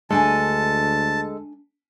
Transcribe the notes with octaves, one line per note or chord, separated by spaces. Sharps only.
D2 G#3 A3 D4 A4 G#5 A5